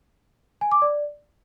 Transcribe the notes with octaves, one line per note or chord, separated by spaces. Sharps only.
G#5
D6
D5